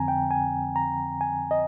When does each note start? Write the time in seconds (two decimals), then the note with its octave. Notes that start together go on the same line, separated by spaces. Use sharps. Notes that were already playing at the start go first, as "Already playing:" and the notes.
Already playing: F2 D3 F3 C4 G#5 A#5
0.08 G5
0.31 G#5
0.76 A#5
1.21 G#5
1.51 D#5